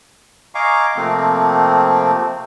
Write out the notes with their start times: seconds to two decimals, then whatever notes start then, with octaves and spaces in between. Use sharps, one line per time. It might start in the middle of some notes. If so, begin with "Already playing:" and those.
0.55 D#5 F5 G#5 A#5 C#6 D6
0.96 C3 F3 A3 A#3 C4